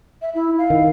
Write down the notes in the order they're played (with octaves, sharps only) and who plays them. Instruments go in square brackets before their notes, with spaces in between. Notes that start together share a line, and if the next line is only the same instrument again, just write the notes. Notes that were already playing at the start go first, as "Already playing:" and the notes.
[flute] E5
E4
F5
[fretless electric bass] D#3